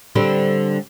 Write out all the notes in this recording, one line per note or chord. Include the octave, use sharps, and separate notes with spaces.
D3 G3 C4